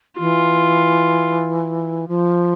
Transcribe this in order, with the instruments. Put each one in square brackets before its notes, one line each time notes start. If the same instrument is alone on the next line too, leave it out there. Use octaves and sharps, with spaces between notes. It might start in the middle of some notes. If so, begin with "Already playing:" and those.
[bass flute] E3 [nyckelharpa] F4
[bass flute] F3